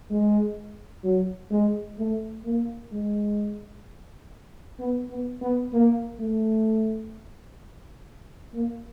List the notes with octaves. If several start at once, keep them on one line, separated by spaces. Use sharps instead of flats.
G#3
F#3
G#3
A3
A#3
G#3
B3
B3
B3
A#3
A3
A#3